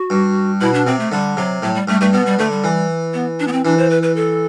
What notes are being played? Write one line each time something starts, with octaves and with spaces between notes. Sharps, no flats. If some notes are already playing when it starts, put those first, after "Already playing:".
Already playing: F#4
G2
B2 E4
D4
C3 C4
A3
D3 G3
C3 F#3
A2 F#3
G3
G2 A3
G2 A3
B2 B3
G3
D3 A3
G3
E3
B3
D4
B3
C4
E3 D4
C5
B4
B4
A4